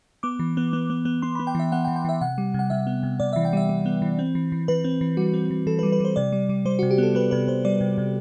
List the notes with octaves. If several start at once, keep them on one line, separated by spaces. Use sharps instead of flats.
B3 D6
E3
B3
B3
B3
B3
B3 C6
B5
B3
G5
E3 E5
B3 F#5
G5
E3
G5
E3 E5
C3 F#5
G3
C3 F#5
C3 E5
B3
C3
C3 D5
E5
E3
G5
G3 E5
G3
B3
E3
C4
E3
E3
E3 B4
C4
E3
G3 F#4
C4
E3
E3 A4
B4
G3
B4
G3 C5
C3 D5
G3
G3
G3 C5
F#4
C3
G4
B3 A4
B3 B4
C3 B4
C3 C5
G3 D5
C3
C3